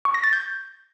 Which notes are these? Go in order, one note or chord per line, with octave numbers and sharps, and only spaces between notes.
C#6
A#6
A6
G6